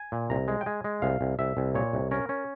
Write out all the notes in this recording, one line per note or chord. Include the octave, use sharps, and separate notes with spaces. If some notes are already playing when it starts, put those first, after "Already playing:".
Already playing: G#5
A#2
C2 A#5
G#3
G5
G#3 G#5
G#3
C2 F5
C2
C2 E5
C2
A#2 C#5
C2
C#4 A#4
C#4